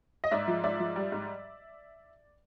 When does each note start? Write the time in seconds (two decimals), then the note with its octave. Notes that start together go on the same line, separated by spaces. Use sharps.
0.24 D#5
0.31 G#2 D5 E5
0.48 F3
0.64 G#2 D5 E5
0.80 F3
0.96 G3
1.12 G#2